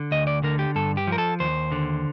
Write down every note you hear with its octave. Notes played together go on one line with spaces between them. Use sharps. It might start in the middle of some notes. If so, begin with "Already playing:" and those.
Already playing: D3
D2 D#5
D5
D3 A#4
G4
G2 A4
G4
F3 A#4
A4
D#2 C5
D3